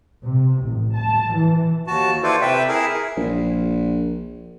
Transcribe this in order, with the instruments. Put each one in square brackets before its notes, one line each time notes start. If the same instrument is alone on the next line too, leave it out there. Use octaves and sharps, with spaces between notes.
[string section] C3
A1
A5
E3
[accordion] D#2 F#4 A5
E4 F4 A4 B4 C5 D5
C3 B4 E5 G5
E4 G#4 A#4 E5
[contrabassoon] A#1